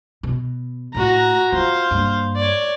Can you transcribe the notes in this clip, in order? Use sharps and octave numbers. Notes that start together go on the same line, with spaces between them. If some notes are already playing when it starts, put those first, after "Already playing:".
B2
A2 A3 F#4 A#5
F4 C5 F5
G2 A#3
C#5 D5